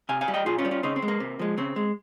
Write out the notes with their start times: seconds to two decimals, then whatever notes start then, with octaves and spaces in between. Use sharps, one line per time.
0.09 C3 F5 G#5
0.21 F5 G#5
0.28 G3
0.34 D#5 G5
0.46 A#2 F4 G#4
0.58 C#4 F4
0.65 G3
0.71 C#4 F4
0.83 C#3 C4 D#4
0.96 C4
1.02 G#3
1.08 A#3
1.20 C3
1.39 F3 G#3
1.57 C#3 C4
1.76 G#3